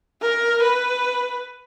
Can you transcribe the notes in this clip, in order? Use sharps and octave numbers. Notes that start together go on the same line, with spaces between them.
A#4
B4